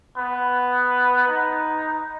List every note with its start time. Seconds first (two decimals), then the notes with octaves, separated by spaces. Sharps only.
0.17 B3
1.27 D#4